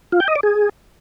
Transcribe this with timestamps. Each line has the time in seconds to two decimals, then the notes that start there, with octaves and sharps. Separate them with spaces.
0.12 F4
0.20 G5
0.28 D#5
0.36 D5
0.43 G#4